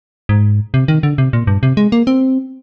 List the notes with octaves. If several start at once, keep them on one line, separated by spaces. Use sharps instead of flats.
G#2
C3
D#3
D3
C3
A#2
G2
C3
G#3
A#3
C4